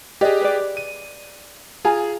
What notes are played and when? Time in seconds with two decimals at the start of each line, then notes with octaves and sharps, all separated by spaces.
0.21 G4 G#4 B4 D5 D#5
0.42 B4 D5
0.77 D#7
1.85 F4 G#4 G#5 A#5